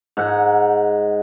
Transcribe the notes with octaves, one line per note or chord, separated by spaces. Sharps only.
G#2 F#5